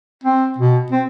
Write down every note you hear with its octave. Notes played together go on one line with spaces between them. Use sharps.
C4
B2
C4